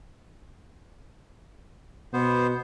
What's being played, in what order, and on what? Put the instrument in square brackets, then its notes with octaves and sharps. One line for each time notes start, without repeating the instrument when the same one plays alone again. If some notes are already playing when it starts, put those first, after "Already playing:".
[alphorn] B2 [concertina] B3 C5